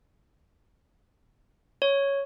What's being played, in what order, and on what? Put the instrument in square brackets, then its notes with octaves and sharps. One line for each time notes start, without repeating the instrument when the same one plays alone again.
[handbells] C#5